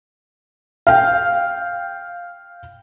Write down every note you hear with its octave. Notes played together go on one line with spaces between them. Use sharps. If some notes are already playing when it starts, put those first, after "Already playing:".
F5 G5